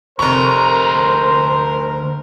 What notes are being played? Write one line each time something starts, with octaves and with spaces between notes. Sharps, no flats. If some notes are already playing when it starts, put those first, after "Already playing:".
F1 D2 A#4 C5 A#5 C#6